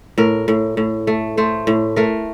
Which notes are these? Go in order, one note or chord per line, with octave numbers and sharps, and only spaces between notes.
A2 A#4
A2
A2
A3
A3 C5
A2
A3 A#4